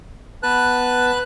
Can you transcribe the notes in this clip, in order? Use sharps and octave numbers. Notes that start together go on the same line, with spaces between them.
B3 B4 A5 F#6